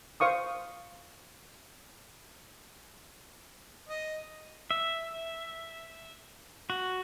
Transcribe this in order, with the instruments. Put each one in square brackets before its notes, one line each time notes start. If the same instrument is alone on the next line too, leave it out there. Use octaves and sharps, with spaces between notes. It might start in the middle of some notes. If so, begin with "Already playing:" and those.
[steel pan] C5 F5 C#6 D#6
[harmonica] D#5
[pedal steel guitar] E5
F#4